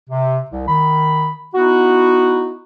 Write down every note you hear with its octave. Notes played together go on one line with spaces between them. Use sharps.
C3
C2
D#3 B5
B3 D#4 E4 F#4